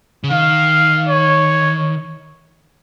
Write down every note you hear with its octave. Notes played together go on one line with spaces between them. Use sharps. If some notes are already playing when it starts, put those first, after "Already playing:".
C#3
D#3 F5
C#5